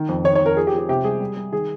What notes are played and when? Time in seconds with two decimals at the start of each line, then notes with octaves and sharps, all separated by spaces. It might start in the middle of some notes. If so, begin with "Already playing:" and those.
Already playing: D#3
0.09 F2
0.24 D#3 C#5
0.35 C#5
0.41 F2 A#4
0.57 F3 G#4
0.67 G4
0.73 F3
0.78 G4
0.89 C3 G4
1.04 G3 G#4
1.20 G3
1.36 G3
1.52 D#3 G#4